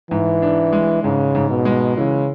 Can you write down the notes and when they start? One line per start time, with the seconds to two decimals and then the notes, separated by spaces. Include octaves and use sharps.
0.11 G#2 E3
0.42 D4
0.73 G#3
1.03 G#2 C#3
1.35 G#2
1.50 B2
1.65 G#3
1.97 C#3 E3